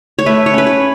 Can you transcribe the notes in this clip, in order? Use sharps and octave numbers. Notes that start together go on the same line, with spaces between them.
C#5
A3 B4
C#5
C#4 B4
C#5